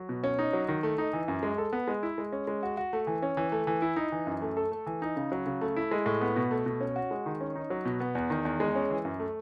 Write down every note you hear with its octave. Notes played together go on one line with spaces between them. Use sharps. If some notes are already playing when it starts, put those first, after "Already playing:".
Already playing: F#3
B2
C#4
D#4
F#3
D#3
A3
D#4
E3
F#2
G#3
A4
B3
G#3
E4
G#3
C#4
G#3
F#4
F#4
A3
E3
C#4
E3
A3
E3
E4
D#4
E3
F#2
A3
A4
A3
E3
D#4
C#3
F#3
C#3
A3
E4
G#3
A2
B3
B2
A3
B2
C#4
F#4
G#3
D#3
C#4
D#4
F#3
B2
B3
E2
D#3
E2
G#3
C#4
E3
F#2
A3